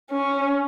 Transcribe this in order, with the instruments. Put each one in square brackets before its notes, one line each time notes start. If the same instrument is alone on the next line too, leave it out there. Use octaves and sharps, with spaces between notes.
[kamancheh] C#4